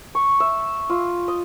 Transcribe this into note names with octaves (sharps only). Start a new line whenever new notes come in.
C#6
E5
F4
D#5